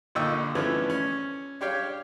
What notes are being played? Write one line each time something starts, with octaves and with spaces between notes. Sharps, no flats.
A#1 D3 D#4 G5 C#6 E6
E3 F3 A3 B3 C#4 D4
C#4
D4 G4 C#5 F5 G5